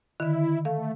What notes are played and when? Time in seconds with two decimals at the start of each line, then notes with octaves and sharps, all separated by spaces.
0.20 D3 D#3 E4
0.65 A3 F5